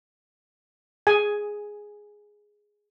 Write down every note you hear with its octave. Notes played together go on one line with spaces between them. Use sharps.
G#4 G#5